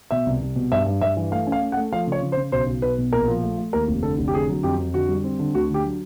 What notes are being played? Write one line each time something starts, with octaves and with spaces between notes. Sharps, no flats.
B2 E5
C2
C2
B2
G2 E5
G2
G2 E5
E3
A3 F5
C#4
F5
A3
F#5
A3
F3 F5
C#3 C#5
C#3
C5
C#3
B1 C5
B1
B1 B4
B2
A#1 A#4
F3
A3
A3
D#2 A#4
F1
D3 A4
F1
G4
D3 G#4
F#3
F2 G4
F2
D3 F#4
G3
C4
D3
D2 F#4
D3
G4
F#3